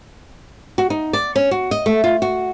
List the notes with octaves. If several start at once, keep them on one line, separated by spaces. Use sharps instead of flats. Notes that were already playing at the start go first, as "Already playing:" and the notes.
F#4
D#4
D5
C#4
F#4
D#5
A3
F4
F#4